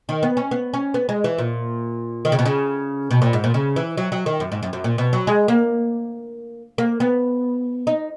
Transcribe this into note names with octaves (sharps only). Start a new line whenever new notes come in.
D#3
B3
C#4
B3
C#4
B3
G#3
E3
A#2
D#3
C#3
B2
C#3
B2
A#2
G#2
A#2
C#3
E3
F#3
F#3
D#3
F#2
G#2
F#2
F#2
A#2
B2
F#3
G#3
A#3
A#3
B3
D#4